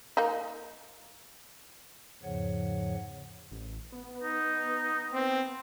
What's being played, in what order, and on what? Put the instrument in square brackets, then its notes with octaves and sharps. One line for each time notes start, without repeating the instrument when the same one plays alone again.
[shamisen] A#3 D#4
[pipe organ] E2 G#2 C#3 F3 C#5 F#5
[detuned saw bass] A1
B3
[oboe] D#4
[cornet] C4